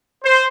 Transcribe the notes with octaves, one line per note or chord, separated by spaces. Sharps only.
C5